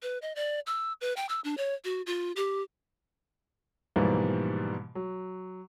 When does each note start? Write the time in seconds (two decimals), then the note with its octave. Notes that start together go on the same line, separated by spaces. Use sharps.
0.03 B4
0.22 D#5
0.36 D5
0.67 E6
1.01 B4
1.17 G5
1.29 E6
1.44 D4
1.57 C#5
1.85 F#4
2.06 F4
2.36 G4
3.96 G#2 B2 E3 F3 G3 A#3
4.95 F#3